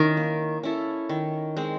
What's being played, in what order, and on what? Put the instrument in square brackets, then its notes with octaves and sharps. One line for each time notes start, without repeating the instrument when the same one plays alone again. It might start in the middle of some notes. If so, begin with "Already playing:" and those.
Already playing: [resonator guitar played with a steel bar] D#3 [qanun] C#4 E4
[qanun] A#3
C#4 E4 A4
D#3
G#3 C4